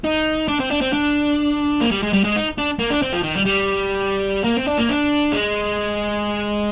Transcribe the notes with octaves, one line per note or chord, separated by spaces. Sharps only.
D#4
D4
C4
D4
C4
D4
A#3
G3
G#3
G3
G#3
D#4
D4
A#3
D4
C4
F3
D#3
G3
G3
A#3
C4
D4
A#3
D4
G#3